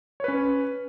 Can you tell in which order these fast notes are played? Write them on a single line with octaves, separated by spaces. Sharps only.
C#5 B4 C#4